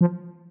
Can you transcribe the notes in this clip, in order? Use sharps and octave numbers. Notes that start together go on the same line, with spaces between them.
F3